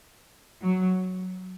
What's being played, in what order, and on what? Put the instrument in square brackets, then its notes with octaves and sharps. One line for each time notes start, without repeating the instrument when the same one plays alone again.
[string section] F#3